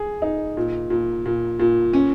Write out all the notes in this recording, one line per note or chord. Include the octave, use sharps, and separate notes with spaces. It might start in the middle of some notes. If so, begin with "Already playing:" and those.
Already playing: G#4
D#4
A#2
A#2
A#2
A#2
C#4